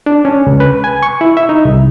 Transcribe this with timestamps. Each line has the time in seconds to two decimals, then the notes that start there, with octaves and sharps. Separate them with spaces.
0.06 D4
0.25 C#4
0.47 C#2
0.60 B4
0.84 G#5
1.03 C#6
1.21 E4
1.37 E5
1.49 D#4
1.65 C2